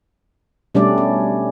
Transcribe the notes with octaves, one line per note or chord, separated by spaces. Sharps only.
B2 G3 A3 C#4 D4 D5
C#4